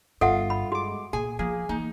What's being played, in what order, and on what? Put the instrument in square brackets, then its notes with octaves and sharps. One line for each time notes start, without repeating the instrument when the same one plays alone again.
[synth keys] G1 [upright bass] G2 [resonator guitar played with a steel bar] F4 [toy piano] A4 E5 F#5
[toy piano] B5
[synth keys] G#3 D6 [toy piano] F#4
[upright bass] A#2 [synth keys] G#4 [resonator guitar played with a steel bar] G#5
[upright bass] F3 [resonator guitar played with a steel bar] A#3 [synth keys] G#4
[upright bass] E3 A#3 [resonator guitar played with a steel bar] D#4